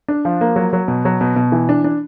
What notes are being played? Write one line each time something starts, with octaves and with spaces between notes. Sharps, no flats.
D4
F3
A#3
F#3
F#3
B2
F#3
B2
B2
E3
D4
D4